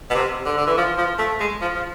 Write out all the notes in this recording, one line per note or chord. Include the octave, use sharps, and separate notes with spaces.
B2
C3
D3
D3
E3
F3
F3
A3
G#3
F3
F3